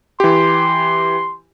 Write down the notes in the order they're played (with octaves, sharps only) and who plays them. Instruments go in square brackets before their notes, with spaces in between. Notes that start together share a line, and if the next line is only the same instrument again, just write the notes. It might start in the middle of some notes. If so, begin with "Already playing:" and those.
[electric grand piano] E3 G4 [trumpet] C6